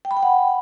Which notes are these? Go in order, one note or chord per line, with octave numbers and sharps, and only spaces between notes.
G5
B5
G5
F#5